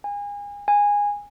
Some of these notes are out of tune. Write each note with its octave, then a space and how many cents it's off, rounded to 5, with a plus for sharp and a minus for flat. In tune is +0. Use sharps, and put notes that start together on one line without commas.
G#5 -30
G#5 -15